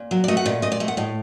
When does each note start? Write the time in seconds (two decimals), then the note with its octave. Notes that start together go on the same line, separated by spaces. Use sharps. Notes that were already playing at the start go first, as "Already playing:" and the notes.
Already playing: A#2
0.11 F#3
0.24 D5
0.28 A3 D#5
0.37 F#5
0.46 A#2 D#5
0.62 A#2 D#5
0.72 D5
0.80 A3 D#5
0.88 F#5
0.97 A2 D#5